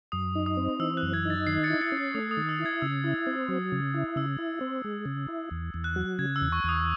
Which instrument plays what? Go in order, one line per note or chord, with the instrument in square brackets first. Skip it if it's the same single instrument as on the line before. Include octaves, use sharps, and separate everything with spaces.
[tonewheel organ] F#2 [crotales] D#6
[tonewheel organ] D#4
[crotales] D#6
[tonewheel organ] C4
[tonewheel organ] E3 [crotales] E6
[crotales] F#6
[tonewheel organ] F#2
[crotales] G#6
[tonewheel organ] D#4 [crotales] A6
[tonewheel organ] D#3 [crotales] C7
[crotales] A6 C#7
[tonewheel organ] E4
[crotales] A6 C#7
[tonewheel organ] C#4
[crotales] A6
[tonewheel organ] A3 [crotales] D#6
[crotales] D#6
[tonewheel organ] D#3
[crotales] E6
[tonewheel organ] E4
[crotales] G#6
[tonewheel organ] C#3 [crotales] E6
[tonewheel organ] E4
C4
F#3
C#3
E4
[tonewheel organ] C#3 [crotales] E6
[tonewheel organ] E4
C4
G#3
C#3
E4
E2
E2
[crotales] F#6
[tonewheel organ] F#3
[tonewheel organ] C#3 [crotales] G#6
[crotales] E6
[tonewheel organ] E2
[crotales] C#6
[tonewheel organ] E2 [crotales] D#6